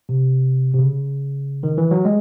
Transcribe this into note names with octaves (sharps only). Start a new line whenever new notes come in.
C3
C3
C#3
D#3
E3
F#3
G#3